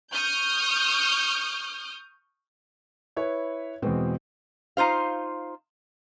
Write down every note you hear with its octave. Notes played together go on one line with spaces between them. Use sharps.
C#6 D#6 F6 G6
E4 B4 C#5
E2 B2 G#3 C4
D#4 F4 C5 F5